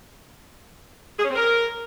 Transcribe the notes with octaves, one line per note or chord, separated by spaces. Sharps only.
G#4
C#4
C4
A#4